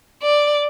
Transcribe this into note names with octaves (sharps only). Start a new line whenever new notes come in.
D5